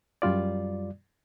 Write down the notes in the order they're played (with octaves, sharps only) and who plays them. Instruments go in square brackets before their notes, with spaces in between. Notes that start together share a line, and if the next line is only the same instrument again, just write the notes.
[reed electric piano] F#2 G3 F4 D5